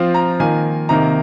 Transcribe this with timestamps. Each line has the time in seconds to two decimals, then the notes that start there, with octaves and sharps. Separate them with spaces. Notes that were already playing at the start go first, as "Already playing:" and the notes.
Already playing: F3 C4 F4
0.14 A#5
0.40 D#3 A#3 F4 G#5
0.89 C3 D#3 A#3 A#5